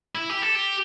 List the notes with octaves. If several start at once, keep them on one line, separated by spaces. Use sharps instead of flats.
E4
G4
A4
G4